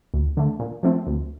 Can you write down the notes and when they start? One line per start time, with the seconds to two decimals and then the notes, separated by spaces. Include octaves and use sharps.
0.14 D2
0.37 D3 A3
0.60 A#2
0.83 F3 A3 C4
1.07 D2